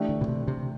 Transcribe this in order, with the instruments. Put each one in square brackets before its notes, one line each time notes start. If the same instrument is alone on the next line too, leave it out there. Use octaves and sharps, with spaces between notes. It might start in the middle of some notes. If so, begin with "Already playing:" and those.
Already playing: [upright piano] E3 A3 D4 G4
[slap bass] D3
B2
C3
C3